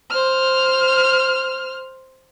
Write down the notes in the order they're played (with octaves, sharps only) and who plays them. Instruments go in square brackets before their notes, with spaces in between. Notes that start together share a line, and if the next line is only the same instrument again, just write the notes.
[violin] C5 F6